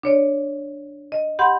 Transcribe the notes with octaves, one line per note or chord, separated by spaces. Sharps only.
D4 C#5 D5
D#5
G4 F#5 B5 C6 G6